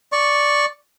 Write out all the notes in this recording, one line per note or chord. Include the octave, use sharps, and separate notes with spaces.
D5 C#6